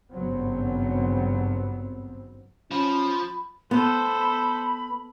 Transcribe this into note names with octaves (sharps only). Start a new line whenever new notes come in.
G#1 G2 C#3 F#3 B3 C4
F3 C#4 B5
B3 A4 C5 B5